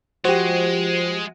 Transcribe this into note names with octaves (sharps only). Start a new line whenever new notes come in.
F3 G#3 F#4 G4 C5